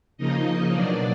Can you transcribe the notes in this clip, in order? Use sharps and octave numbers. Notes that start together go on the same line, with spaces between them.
C#3 F3 A#3 D#4 D#5
B2 F#3 A#3 D4 D5